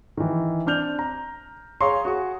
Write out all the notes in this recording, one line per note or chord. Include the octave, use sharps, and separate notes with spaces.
D#3 E3
C4 D4 F6 G6 F7
A#5
G#4 C#5 F5 A#5 C6 C#6
F#4 G#4 C#6